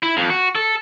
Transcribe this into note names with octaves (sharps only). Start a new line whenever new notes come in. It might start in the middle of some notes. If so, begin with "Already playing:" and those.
E4
F2
F#4
A4